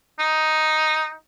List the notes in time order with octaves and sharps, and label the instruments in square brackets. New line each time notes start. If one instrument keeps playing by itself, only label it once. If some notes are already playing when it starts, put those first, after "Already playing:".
[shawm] D#4